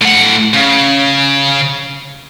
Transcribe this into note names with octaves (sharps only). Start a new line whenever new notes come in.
A2 F#5
C#3